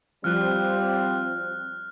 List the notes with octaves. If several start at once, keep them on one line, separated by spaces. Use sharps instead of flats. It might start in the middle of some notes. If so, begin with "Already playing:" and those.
F3 G3 C4 F4 D5 F6 F#6